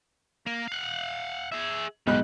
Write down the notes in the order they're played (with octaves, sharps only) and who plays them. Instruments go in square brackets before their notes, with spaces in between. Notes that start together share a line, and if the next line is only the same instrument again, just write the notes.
[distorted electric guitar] A#3 A#4
F5 F#5
G#4 E5
[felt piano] B1 G#2 F#6 [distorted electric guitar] D#3 G3